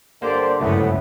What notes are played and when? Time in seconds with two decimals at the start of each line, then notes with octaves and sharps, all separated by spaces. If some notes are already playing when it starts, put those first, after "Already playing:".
0.22 G2 D3 A#3 G4 C5 D5
0.61 G1 C#2 F#2 A2 A3 B3